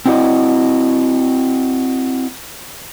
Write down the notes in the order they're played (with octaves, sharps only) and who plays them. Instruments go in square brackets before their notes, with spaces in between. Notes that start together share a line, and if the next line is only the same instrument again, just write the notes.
[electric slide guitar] C4 E4 F#4 G#4 D5 D#5